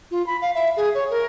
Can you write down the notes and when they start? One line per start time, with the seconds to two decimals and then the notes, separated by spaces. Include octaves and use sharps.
0.11 F4
0.27 B5
0.42 F5
0.55 E5
0.77 G#4
0.95 C#5
1.10 A#4